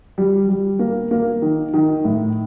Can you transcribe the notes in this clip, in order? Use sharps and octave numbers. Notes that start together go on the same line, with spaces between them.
G3
G3
A#3
A#3
D#3
D#3
A2